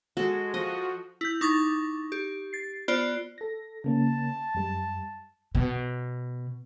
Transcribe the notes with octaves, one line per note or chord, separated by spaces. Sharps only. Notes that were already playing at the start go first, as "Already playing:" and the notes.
G#3 F#4 A4
F3 F#4 D#5
E4 G6
D#4 C#6 D6 A6 A#6
G4
A6 C7
B3 F4 C5 D5
A4 A#6
C#3 A#3 C#4 A5
F#2 G3
B2